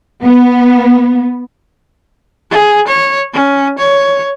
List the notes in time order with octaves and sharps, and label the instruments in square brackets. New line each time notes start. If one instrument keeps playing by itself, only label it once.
[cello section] B3
[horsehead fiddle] G#4
C#5
C#4
C#5